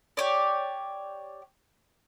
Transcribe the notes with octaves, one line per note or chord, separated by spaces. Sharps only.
G4 C#5 D5